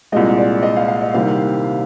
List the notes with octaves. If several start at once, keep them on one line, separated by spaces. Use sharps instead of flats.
C2 A#2 G#3 D#5
D5
D#5
F5
F5
D#5
C2 C3 D#3 G3 A#3 F5